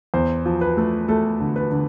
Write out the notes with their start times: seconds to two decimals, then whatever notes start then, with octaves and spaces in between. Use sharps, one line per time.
0.14 E2 C5
0.46 F3
0.61 B4
0.77 A3
1.08 A3 A4
1.40 D3
1.56 B4
1.72 D3